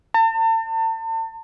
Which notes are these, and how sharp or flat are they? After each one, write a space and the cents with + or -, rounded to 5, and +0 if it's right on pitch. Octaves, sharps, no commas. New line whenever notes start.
A5 +40